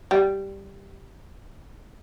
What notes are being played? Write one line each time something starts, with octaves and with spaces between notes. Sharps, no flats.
G3